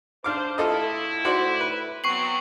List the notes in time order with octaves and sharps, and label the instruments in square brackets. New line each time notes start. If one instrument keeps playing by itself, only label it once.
[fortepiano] D4 F5 D6 [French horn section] C5
[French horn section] A2 E4 [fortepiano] F4 A4 D#5
[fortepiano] F#4 C5 D5
B4
[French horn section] F#3 B3 C4 [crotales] C#6 C7 F#7